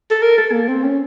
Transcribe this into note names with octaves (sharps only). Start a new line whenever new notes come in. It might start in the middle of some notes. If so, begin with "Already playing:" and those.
A4
A#4
A4
A#3
C4
C#4